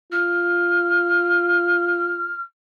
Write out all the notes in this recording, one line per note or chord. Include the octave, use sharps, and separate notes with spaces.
F4 F6